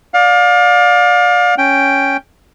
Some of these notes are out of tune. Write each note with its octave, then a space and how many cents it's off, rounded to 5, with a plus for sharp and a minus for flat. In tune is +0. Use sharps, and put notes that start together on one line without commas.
D5 +0 F5 +35
C#4 +0 G5 +0